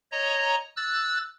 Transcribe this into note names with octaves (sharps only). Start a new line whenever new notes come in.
C#5 D#5 A#5
E6 F#6 A6